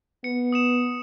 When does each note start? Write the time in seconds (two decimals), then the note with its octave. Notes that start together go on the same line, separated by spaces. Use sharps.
0.24 B3 C#7
0.52 D#6 C#7 E7